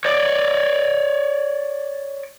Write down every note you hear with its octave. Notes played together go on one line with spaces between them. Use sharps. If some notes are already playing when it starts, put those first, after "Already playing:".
C#5 D5